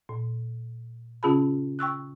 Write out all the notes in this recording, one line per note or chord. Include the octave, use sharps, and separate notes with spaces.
A#2
C#3 C#4 F4 G#4 A5 B5
G5 C#6 E6 F#6